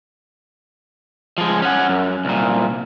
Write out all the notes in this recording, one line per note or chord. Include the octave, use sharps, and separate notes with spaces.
F3 G#3
C#4 F#5
F#2
C2 A#2